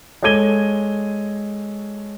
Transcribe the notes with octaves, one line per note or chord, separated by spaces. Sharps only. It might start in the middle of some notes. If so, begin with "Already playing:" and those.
G#3 A4 C#5 G#6 D#7 G7